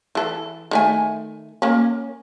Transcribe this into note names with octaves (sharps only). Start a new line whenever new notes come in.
E3 A4
D#3 A3 G#5
A#3 C#4